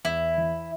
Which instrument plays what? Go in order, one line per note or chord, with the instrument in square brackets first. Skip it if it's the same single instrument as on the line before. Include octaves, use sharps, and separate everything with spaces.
[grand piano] E2 [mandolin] E4
[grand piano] E3